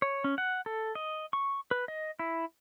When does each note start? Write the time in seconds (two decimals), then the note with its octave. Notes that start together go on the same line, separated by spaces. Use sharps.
0.02 C#5
0.24 C#4
0.38 F#5
0.66 A4
0.95 D#5
1.33 C#6
1.71 B4
1.88 D#5
2.19 E4